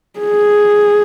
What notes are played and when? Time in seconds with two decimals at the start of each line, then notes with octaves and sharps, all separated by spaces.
0.20 G#4